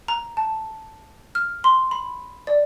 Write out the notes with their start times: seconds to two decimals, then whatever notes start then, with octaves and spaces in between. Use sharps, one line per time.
0.08 A#5
0.37 A5
1.35 F6
1.64 C6
1.91 B5
2.47 D5